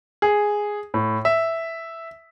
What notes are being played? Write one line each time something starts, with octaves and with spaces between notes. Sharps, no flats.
G#4
A2
E5